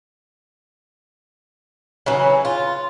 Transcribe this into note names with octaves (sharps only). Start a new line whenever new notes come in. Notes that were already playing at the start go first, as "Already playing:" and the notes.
C#3 E3 F#3
F4